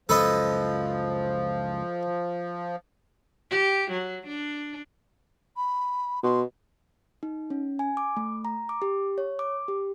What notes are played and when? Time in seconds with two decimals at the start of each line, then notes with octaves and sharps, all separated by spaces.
0.09 C#2 F#2 F3 A4 B4 D#5
3.51 G4
3.91 F#3
4.27 D4
5.57 B5
6.23 B2 C6
7.23 D#4
7.50 C#4
7.79 G#5
7.97 D6
8.17 A3
8.45 A#5
8.69 D6
8.82 G4
9.18 C#5
9.39 D6
9.68 G4